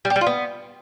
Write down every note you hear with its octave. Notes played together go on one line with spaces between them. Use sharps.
G3
G4
G3
F4
B3